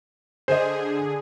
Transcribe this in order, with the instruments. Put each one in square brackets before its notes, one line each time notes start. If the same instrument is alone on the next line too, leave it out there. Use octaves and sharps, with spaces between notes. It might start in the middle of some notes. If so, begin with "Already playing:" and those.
[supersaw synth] D3 G#4 [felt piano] C5 D#5